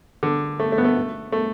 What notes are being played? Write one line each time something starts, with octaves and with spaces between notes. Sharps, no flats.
D3
A3
A3
B3
A3
A3